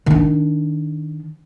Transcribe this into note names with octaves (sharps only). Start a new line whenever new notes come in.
D#3 D4